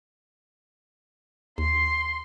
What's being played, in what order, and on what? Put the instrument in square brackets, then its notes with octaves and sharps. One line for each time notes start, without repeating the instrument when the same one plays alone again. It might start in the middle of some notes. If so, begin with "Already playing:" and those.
[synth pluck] D#2 [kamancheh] C6